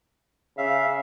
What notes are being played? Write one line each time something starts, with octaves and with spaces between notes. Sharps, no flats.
C#3 E5 F5